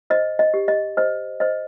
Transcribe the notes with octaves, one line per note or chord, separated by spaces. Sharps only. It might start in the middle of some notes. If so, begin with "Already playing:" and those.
C5 D#5
D#5
G4
D#5
C5 D#5
C5 D#5